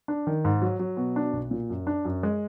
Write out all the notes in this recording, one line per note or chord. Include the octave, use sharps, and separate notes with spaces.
D4
D#3
G#2
F#3
F#3
B2
D4
B1
A#2
F#2
D4
F#2
G#3